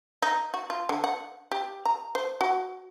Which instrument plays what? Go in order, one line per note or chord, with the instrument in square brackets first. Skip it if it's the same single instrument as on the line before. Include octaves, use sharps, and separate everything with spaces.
[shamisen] D#4
F#4
F4
D3
F#5
G4
A#5
C5
F#4